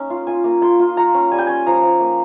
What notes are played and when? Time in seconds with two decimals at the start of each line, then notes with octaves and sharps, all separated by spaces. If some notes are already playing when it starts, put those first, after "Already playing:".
Already playing: A#3 C#4 D#4
0.10 F4
0.27 F4 G#5
0.44 A#3
0.61 F4 C6
0.79 F4
0.97 F4 A#5
1.14 C#4
1.31 G3 G#5
1.39 G5
1.47 C#4 G#5
1.66 F3 A#5
1.83 F3
2.00 A#3